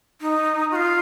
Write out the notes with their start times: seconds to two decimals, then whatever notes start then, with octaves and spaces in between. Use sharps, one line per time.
0.21 D#4
0.71 F#4
0.75 F4